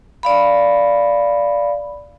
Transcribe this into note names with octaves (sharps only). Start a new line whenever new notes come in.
D5 F5 B5